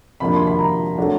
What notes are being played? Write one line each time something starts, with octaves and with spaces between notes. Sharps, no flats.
C3 F3 A#3 D4 B5
C6
B5
A#5
F#3 A3 D4